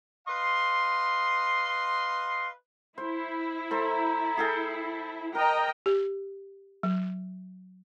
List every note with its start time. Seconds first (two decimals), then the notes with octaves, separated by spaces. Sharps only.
0.28 B4 D#5 F5 C6
2.98 E4 C5
3.71 A4 C5 A#5
4.37 G#4 A4 G5
5.35 A#4 D#5 G5 A#5
5.86 G4
6.83 F#3